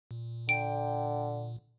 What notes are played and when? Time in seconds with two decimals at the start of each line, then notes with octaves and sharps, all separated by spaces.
0.11 A#2
0.49 D3 G5 D7